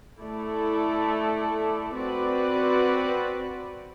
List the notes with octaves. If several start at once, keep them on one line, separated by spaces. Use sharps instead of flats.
A3 E4 A4 D5
C4 F#4 B4 D5